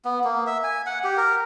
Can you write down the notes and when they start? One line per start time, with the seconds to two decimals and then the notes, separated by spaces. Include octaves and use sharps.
0.05 B3
0.24 A#3
0.47 E5
0.64 G#5
0.86 F#5
1.04 G4
1.17 A#4